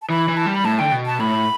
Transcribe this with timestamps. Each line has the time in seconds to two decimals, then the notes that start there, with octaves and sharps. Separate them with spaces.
0.02 A5
0.10 E3 B5
0.28 E3
0.37 A5
0.46 G3
0.55 B5
0.65 A2 A5
0.79 D3 G5
0.92 B2
1.06 A5
1.19 A2 B5